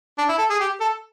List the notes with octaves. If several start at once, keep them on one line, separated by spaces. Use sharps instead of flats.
D4
E4
A4
G#4
G4
A4